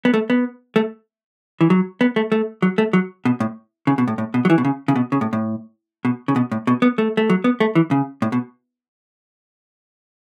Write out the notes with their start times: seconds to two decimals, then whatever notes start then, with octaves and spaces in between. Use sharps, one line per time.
0.05 B3
0.14 A3
0.30 B3
0.76 A3
1.61 E3
1.70 F#3
2.01 B3
2.16 A3
2.32 A3
2.62 F#3
2.78 A3
2.93 F#3
3.25 B2
3.40 A2
3.87 C#3
3.98 B2
4.08 A2
4.18 A2
4.34 B2
4.45 F#3
4.50 E3
4.58 B2
4.65 C#3
4.88 C#3
4.96 B2
5.12 C#3
5.21 A2
5.33 A2
6.05 B2
6.28 C#3
6.36 B2
6.52 A2
6.67 B2
6.82 B3
6.98 A3
7.17 A3
7.30 F#3
7.44 B3
7.60 A3
7.75 E3
7.91 C#3
8.22 A2
8.32 B2